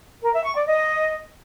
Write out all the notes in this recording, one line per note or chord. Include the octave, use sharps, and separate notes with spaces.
A#4
E5
C#6
D5
D#5